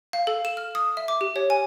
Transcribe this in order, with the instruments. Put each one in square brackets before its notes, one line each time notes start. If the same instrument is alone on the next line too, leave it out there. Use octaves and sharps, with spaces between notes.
[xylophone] F5
A4
E7
F6
D#6
E5
D6
G4
C#5
G#5